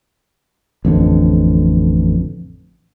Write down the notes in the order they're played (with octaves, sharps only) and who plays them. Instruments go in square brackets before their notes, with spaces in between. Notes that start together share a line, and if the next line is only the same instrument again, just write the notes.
[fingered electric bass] A1 F2 D3